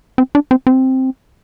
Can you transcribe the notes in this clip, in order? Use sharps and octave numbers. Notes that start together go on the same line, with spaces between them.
C4
D4
C4
C4